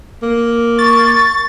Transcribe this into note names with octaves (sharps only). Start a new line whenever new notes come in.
A#3
C#6 A6